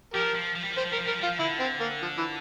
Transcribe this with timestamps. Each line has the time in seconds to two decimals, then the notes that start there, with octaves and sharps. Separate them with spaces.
0.14 F3 G4 A#4
0.35 F3
0.55 F3
0.63 G3
0.70 F3
0.77 G3 C5
0.84 F3
0.92 G3 A#4
0.98 F3
1.06 G3 A#4
1.12 F3
1.20 G3
1.23 F4
1.27 F3
1.39 D3 E4
1.60 C4
1.80 A#3
2.02 F3
2.18 E3